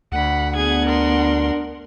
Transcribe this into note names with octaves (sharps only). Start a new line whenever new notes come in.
D2 F#5 B5
B3 D4 G#4 F#5 G#6
A#4 C6